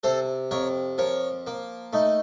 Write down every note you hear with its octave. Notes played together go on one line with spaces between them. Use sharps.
C3 A4 C5
F2 A#4 C#5
F3 A#4 C#5
A#3
A3 D#4